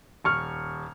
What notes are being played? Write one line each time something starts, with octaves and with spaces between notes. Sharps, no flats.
D#1 C#6 F6